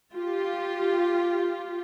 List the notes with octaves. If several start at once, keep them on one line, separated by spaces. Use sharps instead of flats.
F4 G4